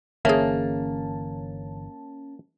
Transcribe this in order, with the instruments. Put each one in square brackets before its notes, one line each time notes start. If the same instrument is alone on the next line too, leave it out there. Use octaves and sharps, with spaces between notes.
[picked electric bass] G1 D3 E3 [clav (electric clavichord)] A#3 [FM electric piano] C#4 A5 [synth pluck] G#4 E5